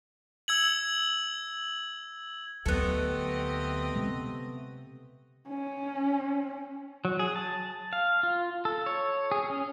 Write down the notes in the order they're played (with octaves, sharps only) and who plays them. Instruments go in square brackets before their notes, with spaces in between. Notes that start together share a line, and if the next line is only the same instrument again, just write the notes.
[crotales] E6 G#6 F#7
[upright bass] D2 F#3 [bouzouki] A3 B3 [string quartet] C4 G4 D#5
[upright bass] C3
[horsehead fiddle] C#4
[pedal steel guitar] F#3
G#4
A5
F5
F4
A4
C#5
G#4
C#4